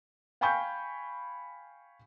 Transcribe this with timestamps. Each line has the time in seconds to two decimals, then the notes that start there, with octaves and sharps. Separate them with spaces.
0.41 F5 G5 G#5 B5 C#6 G6